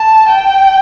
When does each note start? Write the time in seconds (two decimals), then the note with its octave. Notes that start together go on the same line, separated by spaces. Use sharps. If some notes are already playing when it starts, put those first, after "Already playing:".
Already playing: A5
0.29 G5